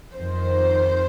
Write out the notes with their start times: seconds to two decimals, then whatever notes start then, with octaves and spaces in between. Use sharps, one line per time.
0.16 F2 D#3 C5